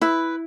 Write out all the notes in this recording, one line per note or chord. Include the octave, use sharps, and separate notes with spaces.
E4 B4